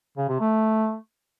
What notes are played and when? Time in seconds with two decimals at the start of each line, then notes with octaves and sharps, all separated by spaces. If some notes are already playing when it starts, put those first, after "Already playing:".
0.17 C#3
0.29 C3
0.40 A3